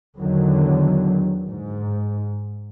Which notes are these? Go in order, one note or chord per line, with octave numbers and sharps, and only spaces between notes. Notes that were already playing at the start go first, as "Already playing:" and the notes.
E2 D3 D#3 F#3
G#2